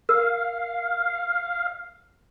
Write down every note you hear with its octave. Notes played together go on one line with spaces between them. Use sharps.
A#4 F5